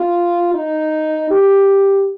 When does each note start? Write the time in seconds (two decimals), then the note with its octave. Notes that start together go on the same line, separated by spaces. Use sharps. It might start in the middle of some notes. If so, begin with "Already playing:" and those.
Already playing: F4
0.54 D#4
1.31 G4